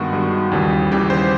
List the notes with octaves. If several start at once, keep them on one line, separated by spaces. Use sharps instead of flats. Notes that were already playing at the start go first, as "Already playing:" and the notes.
Already playing: G2 D#3 G#3 B3 F#4
G2 D#3 G#3 B3
D#2 C#3 E3 G3
D#2 C#3 E3 G3 G4
C5